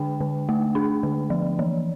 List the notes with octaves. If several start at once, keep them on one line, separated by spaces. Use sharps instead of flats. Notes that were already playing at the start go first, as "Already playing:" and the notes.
Already playing: D3 D4 G5
D3
A3
D4
D3
F3
E3